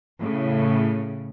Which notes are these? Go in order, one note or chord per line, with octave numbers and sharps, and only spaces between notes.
A2 C#3